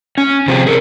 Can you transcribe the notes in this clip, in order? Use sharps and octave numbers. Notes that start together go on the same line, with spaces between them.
C#4
C3 F3 C4 G#4
G#4 A#4